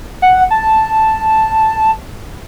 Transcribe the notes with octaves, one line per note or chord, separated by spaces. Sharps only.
F#5
A5